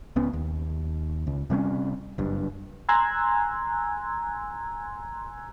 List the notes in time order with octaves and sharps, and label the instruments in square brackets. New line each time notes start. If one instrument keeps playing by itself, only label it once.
[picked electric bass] C#2 B3 C#4
D#2
C#2
C3 G3 A#3 C#4
F#1 G2
[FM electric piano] G#5 A#5 C6 E6 F#6 G#6